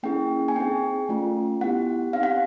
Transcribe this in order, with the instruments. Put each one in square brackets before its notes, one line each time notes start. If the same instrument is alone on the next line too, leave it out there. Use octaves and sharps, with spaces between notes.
[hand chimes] A#3 C#4 E4 G#4 G5
G#5
C4 D#4 G#4 G5
A3 C#4 F4
B3 E4 G4 F#5
C4 D#4 G4 F5
F#5